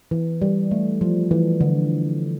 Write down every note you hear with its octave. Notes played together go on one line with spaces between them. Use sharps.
E3
G3
A3
F3
E3
D3